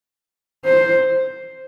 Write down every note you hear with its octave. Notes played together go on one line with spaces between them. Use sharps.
C5